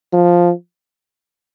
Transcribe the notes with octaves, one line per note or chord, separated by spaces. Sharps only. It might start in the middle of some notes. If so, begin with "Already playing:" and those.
F3